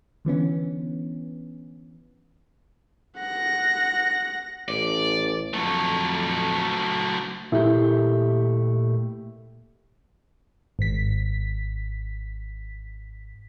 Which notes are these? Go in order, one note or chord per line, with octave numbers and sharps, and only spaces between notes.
D3 E3 B3 C#4
F#5 A#6
A1 D5
F2 F#3 A3
A#2 A3 E4 G4
G#1 B6